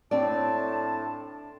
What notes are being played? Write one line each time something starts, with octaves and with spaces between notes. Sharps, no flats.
A2 C4 D4 D5 A5